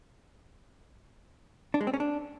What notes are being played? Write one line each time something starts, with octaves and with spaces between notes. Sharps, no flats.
D4
G#3
C4
C#4
D4